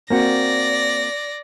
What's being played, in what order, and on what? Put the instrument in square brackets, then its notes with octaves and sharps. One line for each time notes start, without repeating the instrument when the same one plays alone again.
[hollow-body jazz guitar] A#3 C4 F#4 [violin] D5 A#6